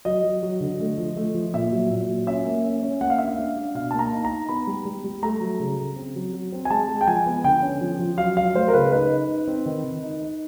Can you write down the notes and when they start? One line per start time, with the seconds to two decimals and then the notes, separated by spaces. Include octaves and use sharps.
0.05 F#3 D#5
0.23 F#3
0.43 F#3
0.61 D3
0.80 A3
0.98 F3
1.16 A3
1.35 F3
1.54 A#2 E5
1.72 F#3
1.90 A#2
2.08 F#3
2.27 C#4 E5
2.45 A#3
2.64 C#4
2.83 C#4
3.01 A#3 F#5
3.10 F5
3.18 D4 E5
3.28 F5
3.38 D4
3.57 D4
3.74 B2 F5
3.91 A#3 A5
3.99 A#5
4.12 D#4
4.25 A#5
4.30 D#4
4.49 B3 B5
4.67 G3
4.85 G3
5.04 G3
5.22 A3 A#5
5.41 F#3
5.60 C#3
5.78 C#3
5.96 C4
6.15 F#3
6.33 F#3
6.52 C4
6.65 G#5
6.70 G#3 A5
6.88 G#3
7.01 G5
7.07 F3 G#5
7.26 B3
7.44 D3 G5
7.62 C#4
7.81 F3
7.99 F3
8.18 F#3 F5
8.37 F#3 F5
8.54 A3 C5
8.68 A#4
8.73 C#3 B4
8.92 D#4 B4
9.10 D#4
9.29 D#4
9.48 C4
9.66 D#3
9.84 D#3
10.03 D#4
10.22 D#4